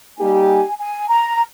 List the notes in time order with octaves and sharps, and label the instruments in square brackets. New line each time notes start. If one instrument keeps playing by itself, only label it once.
[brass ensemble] G3 A#3 D#4 G4 [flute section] G#5
[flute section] G#5
A#5